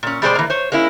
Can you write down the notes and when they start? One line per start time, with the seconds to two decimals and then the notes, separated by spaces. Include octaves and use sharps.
0.03 A#2 C#4
0.22 B2 G3 G#3 G#4 C5 D5
0.35 E3 A#3
0.50 C5 C#5
0.72 G#3 A#3 C#4 E4